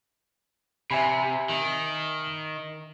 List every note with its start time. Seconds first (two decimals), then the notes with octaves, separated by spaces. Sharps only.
0.91 C3 E5 G#5 B5
1.49 D#3